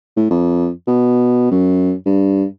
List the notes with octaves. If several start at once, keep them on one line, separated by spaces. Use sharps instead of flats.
A2
F2
B2
F#2
G2